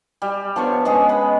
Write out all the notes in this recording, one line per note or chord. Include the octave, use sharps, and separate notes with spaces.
G3
F3 B3 D4 C#5
G#3 B3 C#4 G#4
B5